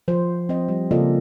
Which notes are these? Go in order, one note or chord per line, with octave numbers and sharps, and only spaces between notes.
F3 C5
C4 D#5
G3
C#3 A#3 F4 A4 D5 D#5